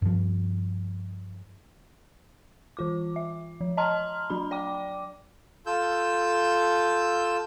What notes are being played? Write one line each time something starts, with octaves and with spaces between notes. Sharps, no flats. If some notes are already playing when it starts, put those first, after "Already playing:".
G2 F3
E3 F4 D6
E5
F3
D#5 A5 A#5 C6 F6
F#3 D4 B5
D5 G5 D6
F4 A4 E6 G6